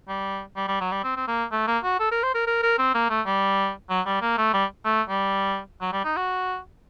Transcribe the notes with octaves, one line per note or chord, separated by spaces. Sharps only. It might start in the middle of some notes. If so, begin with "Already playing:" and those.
G3
G3
G3
F#3
G3
C4
C4
A#3
A3
A#3
F#4
A4
A#4
C5
A#4
A#4
A#4
C4
A#3
A3
G3
F#3
G3
A#3
A3
G3
A3
G3
F#3
G3
D#4
F#4